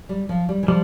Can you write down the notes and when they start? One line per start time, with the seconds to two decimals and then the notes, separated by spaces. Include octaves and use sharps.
0.09 G3
0.29 F3
0.49 G3
0.63 E3
0.68 F3 G3